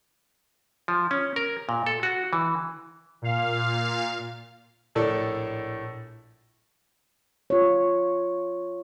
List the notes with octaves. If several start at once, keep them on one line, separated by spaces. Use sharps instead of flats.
F3
C#4
A#4
A#2
A4
F#4
E3
A#2 F5
A#1 A2 A4 D5 A5
F4 C#5